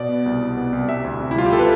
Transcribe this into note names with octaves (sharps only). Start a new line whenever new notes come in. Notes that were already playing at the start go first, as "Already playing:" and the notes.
Already playing: B2 D5
B3
C2
C2
B3
C2
C3 E5
D2
C3
E4
G3 F4
G4
C3 A4
B4